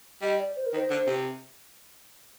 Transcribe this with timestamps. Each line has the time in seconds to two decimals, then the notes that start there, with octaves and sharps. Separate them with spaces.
0.22 G3 D#5
0.39 D5
0.56 C5
0.66 A#4
0.73 D#3
0.76 C5
0.90 D3
1.07 C3